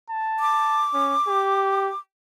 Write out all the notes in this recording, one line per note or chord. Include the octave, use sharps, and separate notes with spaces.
A5
D6
C#4
G4